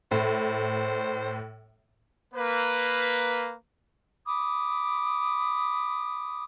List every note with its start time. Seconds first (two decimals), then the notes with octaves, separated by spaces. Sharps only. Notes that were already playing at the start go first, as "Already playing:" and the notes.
0.11 A2 C5
2.34 A#3 B4
4.26 B5 D6 D#6